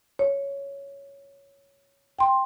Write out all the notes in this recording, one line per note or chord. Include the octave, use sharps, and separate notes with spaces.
C#5
G5 C6